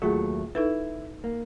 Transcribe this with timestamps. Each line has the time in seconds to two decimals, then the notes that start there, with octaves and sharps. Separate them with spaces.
0.02 D#2 F#3 A3 F4 G#4 F#5
0.55 D#4 E4 A4 B4
1.24 A#3